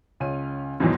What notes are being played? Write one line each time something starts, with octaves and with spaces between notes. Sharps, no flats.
C#2 C#4 D#7
E2 G#2 B2 D#3 E3 F#3